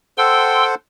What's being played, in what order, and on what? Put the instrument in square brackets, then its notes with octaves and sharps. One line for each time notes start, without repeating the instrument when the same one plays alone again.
[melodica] A4 C5 F#5 [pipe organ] G5 C6 E6